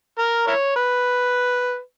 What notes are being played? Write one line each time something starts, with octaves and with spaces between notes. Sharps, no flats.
A#4
E4 A#4 C#5
B4